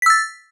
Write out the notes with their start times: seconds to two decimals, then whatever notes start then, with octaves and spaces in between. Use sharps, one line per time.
0.02 B6
0.06 E6
0.10 A6